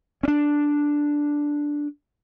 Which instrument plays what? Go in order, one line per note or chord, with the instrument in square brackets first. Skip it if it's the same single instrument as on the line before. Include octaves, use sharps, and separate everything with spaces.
[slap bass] C#4 D4